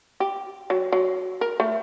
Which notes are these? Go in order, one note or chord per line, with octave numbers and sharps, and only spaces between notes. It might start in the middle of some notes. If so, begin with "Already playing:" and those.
G4
F#3
F#3
A#4
A3